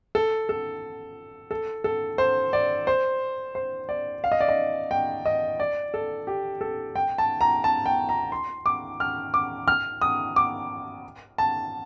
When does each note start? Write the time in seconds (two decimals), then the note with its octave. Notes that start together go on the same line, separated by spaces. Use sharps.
0.15 A4
0.49 A4
1.51 A4
1.84 A4
2.18 C5
2.53 D5
2.87 C5
3.55 C5
3.89 D5
4.24 F5
4.32 D#5
4.41 D5
4.48 D#5
4.91 G5
5.26 D#5
5.60 D5
5.94 A4
6.27 G4
6.61 A4
6.96 G5
7.18 A5
7.41 A#5
7.64 A5
7.86 G5
8.09 A#5
8.32 C6
8.66 D6
9.00 F6
9.34 D6
9.68 F6
10.01 D#6
10.36 D6
11.38 A5